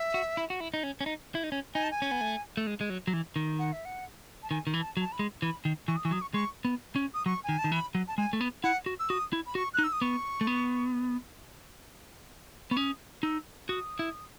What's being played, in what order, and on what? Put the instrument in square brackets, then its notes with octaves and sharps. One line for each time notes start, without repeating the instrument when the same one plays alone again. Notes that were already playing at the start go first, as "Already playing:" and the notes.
Already playing: [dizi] E5
[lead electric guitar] F#4
E4
F#4
E4
D#4
C#4
C#4
D#4
E4
D#4
C#4
[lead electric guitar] D#4 [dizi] G#5
[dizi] A5
G#5
[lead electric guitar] C#4
B3
A3
A3
G#3
G#3
F#3
F#3
E3
D#3
[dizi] F#5
E5
F#5
A5
[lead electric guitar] D#3 [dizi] G#5
[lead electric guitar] D#3
E3
[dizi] A5
[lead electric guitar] F#3
[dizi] A5
B5
[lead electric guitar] G#3
[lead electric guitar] E3 [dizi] B5
[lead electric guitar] D#3
[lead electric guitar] E3 [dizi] C#6
[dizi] D#6
[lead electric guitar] E3 [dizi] C#6
[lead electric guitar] F#3 [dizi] D#6
[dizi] C#6
[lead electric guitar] G#3 [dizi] C#6
[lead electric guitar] B3
C#4
[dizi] D#6
[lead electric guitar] F#3 [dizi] C#6
[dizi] G#5
[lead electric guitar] D#3
[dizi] A5
[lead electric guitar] D#3
[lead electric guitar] E3 [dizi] B5
[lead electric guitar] F#3
[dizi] A5
[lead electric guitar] G#3 [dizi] G#5
[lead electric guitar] A3
B3
[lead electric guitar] E4 [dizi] F#5
[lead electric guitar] F#4
[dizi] E6
[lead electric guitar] F#4 [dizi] D#6
[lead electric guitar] E4
[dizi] B5
[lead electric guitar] F#4 [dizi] C#6
[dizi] F#6
[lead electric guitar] D#4
[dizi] E6
D#6
[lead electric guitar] B3 [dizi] C#6
[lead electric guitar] A3
B3
[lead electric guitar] B3 [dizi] C#6
[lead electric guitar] C#4 [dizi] D#6
[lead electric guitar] D#4 [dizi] E6
[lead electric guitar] F#4 [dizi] D#6
[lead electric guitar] E4